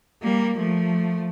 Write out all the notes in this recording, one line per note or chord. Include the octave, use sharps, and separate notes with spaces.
G3 A#3
F3 A3